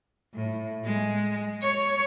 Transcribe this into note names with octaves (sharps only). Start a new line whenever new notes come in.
A2
G#3
C#5